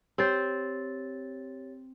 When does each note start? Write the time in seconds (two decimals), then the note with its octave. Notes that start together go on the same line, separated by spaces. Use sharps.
0.18 C4 G4 C5 C#5 A6